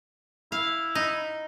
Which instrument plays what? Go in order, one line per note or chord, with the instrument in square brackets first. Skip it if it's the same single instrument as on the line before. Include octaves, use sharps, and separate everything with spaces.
[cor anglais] E4 [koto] F5
[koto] D#4